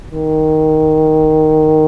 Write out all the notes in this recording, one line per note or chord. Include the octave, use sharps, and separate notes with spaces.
D#3